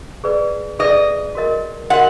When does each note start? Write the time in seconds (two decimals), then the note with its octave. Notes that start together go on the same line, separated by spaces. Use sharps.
0.24 G#4 B4 D5
0.79 G#4 B4 D5 D#5
1.35 F#4 A#4 D#5
1.90 F#4 A#4 D#5 F#5